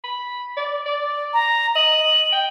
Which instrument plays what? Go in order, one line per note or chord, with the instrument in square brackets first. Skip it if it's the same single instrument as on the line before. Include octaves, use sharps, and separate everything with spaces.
[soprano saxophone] B5
D5
D5
[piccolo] A#5
[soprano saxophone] D#5 [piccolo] F#7
[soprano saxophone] G5